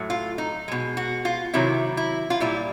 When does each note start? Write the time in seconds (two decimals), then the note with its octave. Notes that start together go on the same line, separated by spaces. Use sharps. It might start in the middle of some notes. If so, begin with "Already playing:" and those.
Already playing: A2 F#3 A3
0.10 F4
0.38 D#4
0.68 B2 G#3
0.97 F#4
1.25 F4
1.54 C3 D#3 F#3 E4
1.97 E4
2.30 F4
2.40 A#2 G3 E4